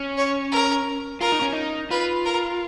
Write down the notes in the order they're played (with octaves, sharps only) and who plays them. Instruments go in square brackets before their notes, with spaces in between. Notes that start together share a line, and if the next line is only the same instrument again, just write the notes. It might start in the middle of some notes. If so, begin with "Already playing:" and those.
Already playing: [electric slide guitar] C#4
[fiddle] C#5
A#4
[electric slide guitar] F4 [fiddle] A#4
[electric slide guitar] D#4
C#4
D#4
[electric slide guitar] F4 [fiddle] B4
[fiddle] A#4